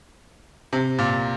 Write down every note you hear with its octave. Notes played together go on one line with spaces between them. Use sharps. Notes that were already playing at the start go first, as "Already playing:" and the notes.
C3
A#2